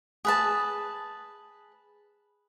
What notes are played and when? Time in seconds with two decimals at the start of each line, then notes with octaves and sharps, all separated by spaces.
0.25 G#4 B4 A5